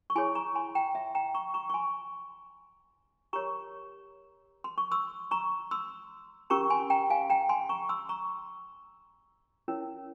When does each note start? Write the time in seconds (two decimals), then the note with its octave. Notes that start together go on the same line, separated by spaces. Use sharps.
0.10 C#6
0.15 E4 G#4 C#5 G#5 C6
0.35 A#5 C#6
0.55 G#5 C6
0.75 G5 A#5
0.95 E5
1.15 G5 A#5
1.35 A#5 C#6
1.54 A#5 C#6
1.70 C#6
1.74 G#5 C6
3.33 G4 A#4 C#5 A#5 C#6
4.64 C6
4.78 C#6
4.91 C6 E6
5.31 A#5 C#6
5.71 C6 E6
6.50 C#4 G4 A#4 A#5 C#6
6.70 G#5 C6
6.90 G5 A#5
7.10 F5 G#5
7.30 G5 A#5
7.49 G#5 C6
7.69 A#5 C#6
7.89 C6 E6
8.09 A#5 C#6
9.68 C#4 E4 A#4 C#5